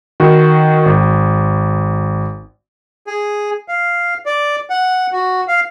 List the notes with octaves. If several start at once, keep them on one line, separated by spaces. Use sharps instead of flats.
D#3 F#4
G#1
G#4
F5
D5
F#5
F#4
F5